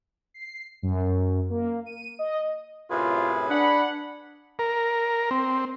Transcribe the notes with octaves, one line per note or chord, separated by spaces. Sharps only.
C7
F#2
A#3
D#7
D#5
F#2 A2 C3 F4 G#4 B4
D4 F#5 B5
A#4
C4